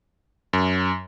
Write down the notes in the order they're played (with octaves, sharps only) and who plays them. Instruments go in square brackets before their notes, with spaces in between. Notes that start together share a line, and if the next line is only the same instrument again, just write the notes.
[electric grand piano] F#2